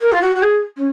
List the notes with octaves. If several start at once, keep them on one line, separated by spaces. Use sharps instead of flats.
A#4
F4
F#4
F#4
G#4
C#4